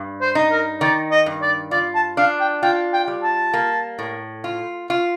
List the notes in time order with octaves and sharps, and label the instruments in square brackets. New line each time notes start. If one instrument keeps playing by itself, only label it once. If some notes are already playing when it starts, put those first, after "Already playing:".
Already playing: [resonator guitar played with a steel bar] G2
[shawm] C5
[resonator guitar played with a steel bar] D#4
[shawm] A#4
[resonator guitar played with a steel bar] D#3 [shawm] D5
[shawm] D#5
[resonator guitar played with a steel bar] G2
[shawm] D5
[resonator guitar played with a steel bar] F4 [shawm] D5
[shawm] A5
[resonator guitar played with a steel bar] D4 [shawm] F5
[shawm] G5
[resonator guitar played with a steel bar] F4 [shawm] G5
[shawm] G5
[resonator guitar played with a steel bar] G3
[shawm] A5
[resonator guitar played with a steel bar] A#3
A2
F4
F4